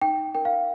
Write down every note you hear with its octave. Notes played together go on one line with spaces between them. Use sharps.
D#4 G5
A#4 G5
F5